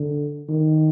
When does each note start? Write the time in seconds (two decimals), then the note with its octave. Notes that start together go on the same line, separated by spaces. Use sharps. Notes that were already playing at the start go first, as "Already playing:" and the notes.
Already playing: D3
0.48 D#3